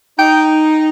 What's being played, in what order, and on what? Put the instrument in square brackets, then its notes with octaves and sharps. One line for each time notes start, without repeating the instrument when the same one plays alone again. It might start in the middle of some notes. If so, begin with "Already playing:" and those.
[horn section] D#4 [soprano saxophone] G5